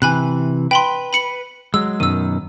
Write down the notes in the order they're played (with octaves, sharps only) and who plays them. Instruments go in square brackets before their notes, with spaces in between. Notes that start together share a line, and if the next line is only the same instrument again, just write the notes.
[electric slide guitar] C3 E3 [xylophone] G#5 B5 F#6
[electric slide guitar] B4 [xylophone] G5 B5 C6
[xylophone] B5 C#7 F#7
[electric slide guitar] F#3 G#3 [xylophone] E6
[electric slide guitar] F#2 B2 D#3 [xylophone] E6 D#7